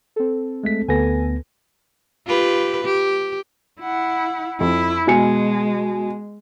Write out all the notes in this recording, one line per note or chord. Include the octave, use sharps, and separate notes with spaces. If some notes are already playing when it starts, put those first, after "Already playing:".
C4 A4
G#3 A3 B6
D2 B3 A4 B4 G#5 A#6
F4 G4 B4
G4
E4 F#5
F2 E4
B2 G#3 G#5 C#7